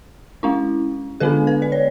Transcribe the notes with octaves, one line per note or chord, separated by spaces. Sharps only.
G#3 C#4 E4
D3 G#3 B3 D4 A4
B4
D5
C#5